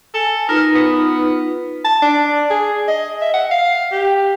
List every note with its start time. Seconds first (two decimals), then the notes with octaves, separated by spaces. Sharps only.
0.14 A4 G#5
0.49 D#4 F4 A#4 B4
0.75 B3
1.84 A5
2.02 D4
2.50 G#4
2.88 D#5
3.22 E5
3.34 F#5
3.51 F5
3.92 G4